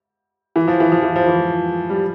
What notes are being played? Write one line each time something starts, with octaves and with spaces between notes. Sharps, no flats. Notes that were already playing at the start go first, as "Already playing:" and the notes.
E3
F3
E3
F3
E3
F3
E3
G3